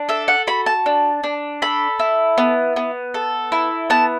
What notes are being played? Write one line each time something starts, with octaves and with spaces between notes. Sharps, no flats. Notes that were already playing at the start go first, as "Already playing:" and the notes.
Already playing: D4
A4 E5
F#5
F#4 B5
A5
D4
D4
A4 B5
E4
B3
B3
A4
E4
B3 A5